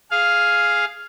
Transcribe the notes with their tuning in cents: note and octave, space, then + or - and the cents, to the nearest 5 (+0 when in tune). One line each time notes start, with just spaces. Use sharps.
G#4 +0 F5 +0